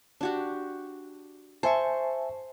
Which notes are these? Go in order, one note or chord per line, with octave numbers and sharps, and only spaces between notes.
D4 F#4 G4
C5 E5 G#5 A5 C#6